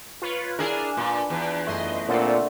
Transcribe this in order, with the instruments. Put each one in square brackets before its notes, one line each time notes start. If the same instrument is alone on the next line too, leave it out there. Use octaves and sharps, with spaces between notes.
[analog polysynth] F4 B4 C#5
[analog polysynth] D4 [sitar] E4 G#4 A#4
[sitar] A#2 [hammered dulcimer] F4 B4
[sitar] E2
[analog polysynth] F#2 D#5 C6 [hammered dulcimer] A3
[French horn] A#2 [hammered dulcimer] D3 [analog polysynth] C4 F4 A4